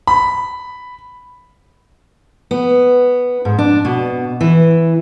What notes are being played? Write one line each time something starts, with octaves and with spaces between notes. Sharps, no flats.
B5
B3
G#2
D4
B2
E3